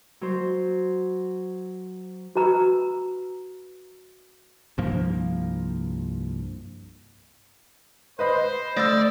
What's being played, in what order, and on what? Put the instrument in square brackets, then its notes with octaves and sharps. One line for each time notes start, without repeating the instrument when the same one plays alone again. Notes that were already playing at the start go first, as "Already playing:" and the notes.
[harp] F#3 C5
[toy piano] F#4 B4 A#5 B5 E6
[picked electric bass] C2 G2 F3 A#3
[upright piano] B4 D#5 B5 [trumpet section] C5
[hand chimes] A3 E6 [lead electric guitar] D5 [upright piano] G6 A6 A#6